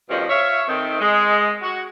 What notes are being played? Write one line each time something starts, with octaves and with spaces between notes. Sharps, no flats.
F2 B2 D#3 F3 G3 C#4
C#5 E5 F5
D#3 A3 C4
G#3
F#4